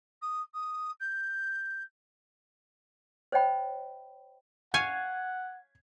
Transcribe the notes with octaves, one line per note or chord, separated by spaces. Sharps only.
D#6
D#6
G6
C5 C#5 D#5 G5 B5
C#5 F5 F#5 G#5 G#6